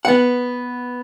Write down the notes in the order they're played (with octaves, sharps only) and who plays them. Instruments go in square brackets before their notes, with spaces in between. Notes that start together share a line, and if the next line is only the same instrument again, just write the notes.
[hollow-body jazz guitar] B3 F#5